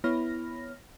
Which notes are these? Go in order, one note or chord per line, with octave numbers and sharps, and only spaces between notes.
B3 E4 C#5 B5 F6 A#6